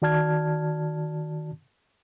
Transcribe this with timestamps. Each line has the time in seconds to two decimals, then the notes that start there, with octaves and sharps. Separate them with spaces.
0.02 D#3 F#4 D5 A5 F6 G#6